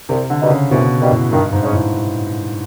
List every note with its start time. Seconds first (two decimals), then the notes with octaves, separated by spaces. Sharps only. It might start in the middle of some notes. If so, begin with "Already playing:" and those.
0.09 C2 C3
0.30 D3
0.41 B2 G3 A#3 D#4
0.50 C#3
0.71 C2 B2
1.01 B2 G3 A#3 D#4
1.11 A2
1.32 G2 D#3
1.52 G#2
1.62 G#3 C#4
1.73 A2